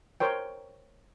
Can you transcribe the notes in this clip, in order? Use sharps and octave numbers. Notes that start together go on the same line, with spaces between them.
A#4 C5 C#5 G5